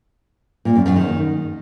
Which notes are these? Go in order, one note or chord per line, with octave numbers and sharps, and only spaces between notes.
A#2
F#2
F#2
D#3